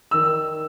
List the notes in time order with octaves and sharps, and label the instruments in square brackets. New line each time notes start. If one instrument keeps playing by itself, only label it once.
[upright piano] D#3 E6